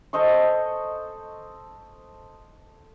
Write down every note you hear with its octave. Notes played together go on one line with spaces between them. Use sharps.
A4 C5 D#5 C#6